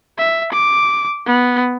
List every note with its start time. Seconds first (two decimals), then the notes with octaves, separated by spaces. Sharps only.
0.18 E5
0.52 D6
1.26 B3